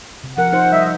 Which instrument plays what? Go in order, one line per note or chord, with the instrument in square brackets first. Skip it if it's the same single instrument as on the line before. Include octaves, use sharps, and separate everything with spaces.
[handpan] C3
[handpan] F3 A#4 [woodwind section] F#5
[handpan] D#4 C5
[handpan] G3 [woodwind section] D#5 E5